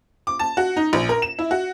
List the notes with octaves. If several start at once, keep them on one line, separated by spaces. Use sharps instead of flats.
D6
A5
F#4
D#4
A#1
A#4
E7
E4
F#4